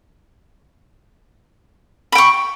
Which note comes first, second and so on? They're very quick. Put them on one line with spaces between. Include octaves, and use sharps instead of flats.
B5 G5 C#6